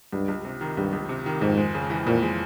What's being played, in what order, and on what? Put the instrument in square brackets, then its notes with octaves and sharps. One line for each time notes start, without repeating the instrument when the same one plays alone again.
[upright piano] C#2 [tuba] G2
[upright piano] C#2
C3
D#3
[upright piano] C#2 [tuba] G2
[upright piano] C#2
C3
D#3
[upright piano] F2 [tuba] G#2
[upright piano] G#3
C#3
E3
[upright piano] F2 [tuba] A#2
[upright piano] G#3